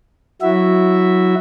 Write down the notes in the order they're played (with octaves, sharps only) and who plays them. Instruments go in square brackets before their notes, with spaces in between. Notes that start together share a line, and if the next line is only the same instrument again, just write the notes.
[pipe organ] F#3 E4 F#4 E5